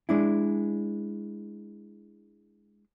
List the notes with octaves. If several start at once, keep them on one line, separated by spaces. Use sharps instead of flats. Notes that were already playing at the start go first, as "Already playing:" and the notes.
G#3 D4 E4